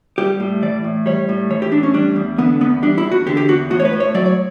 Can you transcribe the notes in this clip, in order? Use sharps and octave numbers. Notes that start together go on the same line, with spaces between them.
G3 G4
A2
E3 D5
A2
G3 C#5
A2
E3 C#5
G4
A2 D4
C#4
G3 D4
E2
D3 B3
E2 B3
G3 D4
E4
E2
F#4
D3 G4
G4
E2 F#4
A2 F#4
C#5
B4
A2
C#5
F#3 D5
C#5